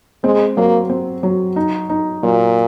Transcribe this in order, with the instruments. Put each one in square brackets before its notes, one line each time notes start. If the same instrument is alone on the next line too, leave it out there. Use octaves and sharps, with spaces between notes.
[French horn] G#3 [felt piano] C4
[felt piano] F#3 [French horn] A#3
[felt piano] C4
F#3
D#4
D#4
[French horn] A#2 [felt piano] F#3